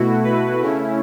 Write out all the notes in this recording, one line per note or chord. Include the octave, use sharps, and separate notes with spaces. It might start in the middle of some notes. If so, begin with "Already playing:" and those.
Already playing: B2 A3 E4 F#4
B4
C#3 A3 C#4 E4